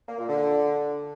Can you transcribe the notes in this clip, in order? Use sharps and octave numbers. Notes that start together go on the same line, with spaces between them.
A#3
A#2
D3